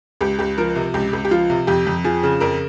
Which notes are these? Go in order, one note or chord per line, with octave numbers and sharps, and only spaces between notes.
C#2 G4
C#2 G4
F3 A#4
C3
C#2 G4
C#2
G4
F3 F4
C3
F2 G4
F2
F3 G#4
C#3
F2 A#4